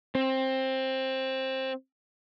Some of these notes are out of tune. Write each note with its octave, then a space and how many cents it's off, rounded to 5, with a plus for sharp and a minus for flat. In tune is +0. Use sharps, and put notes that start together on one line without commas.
C4 +15